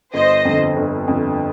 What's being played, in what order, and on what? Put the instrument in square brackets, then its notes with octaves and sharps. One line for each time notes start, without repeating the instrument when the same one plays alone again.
[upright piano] G1 [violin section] C5 D#5
[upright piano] F2 D3
G1
F2 D3